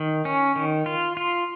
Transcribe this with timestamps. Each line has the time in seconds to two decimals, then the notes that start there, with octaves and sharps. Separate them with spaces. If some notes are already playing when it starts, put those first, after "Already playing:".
Already playing: D#3
0.25 C#4
0.56 D#3
0.86 F4
1.17 F4